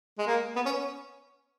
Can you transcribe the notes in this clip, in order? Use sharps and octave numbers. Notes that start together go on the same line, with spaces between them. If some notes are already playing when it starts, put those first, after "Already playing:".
G#3
A#3
B3
C#4